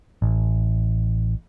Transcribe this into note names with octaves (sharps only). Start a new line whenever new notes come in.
A1